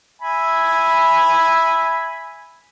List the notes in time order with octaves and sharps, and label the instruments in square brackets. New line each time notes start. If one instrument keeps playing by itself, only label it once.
[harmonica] E5 G#5 B5